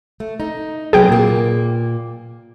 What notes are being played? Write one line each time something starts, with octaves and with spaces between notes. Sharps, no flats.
A3
D#4
C3 F#3 B3 G#4 G5
A#2 A#3